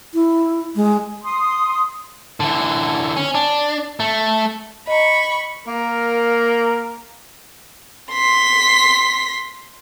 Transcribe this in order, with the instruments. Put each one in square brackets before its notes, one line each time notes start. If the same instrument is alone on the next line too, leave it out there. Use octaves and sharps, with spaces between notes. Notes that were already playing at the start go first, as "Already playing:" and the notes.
[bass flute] E4
G#3
[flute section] C6 D#6
[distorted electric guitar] D3 E3
C#4
D4
A3
[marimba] D#5 A#5 [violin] B5 C#6
[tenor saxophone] A#3 [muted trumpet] A#4
[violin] C6 B6